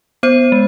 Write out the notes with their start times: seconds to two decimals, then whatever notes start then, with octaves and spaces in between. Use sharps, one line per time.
0.23 B3 C5
0.52 G#3